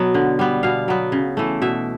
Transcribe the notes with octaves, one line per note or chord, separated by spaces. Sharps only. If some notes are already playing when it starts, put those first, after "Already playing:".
Already playing: B2 F#3 B3
D3
G3 B3
B2 F5
F#3 B3
C#3
E3 A3
B2 E5